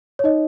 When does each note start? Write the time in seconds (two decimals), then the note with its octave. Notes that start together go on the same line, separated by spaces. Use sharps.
0.19 C#5
0.24 D#4 D#5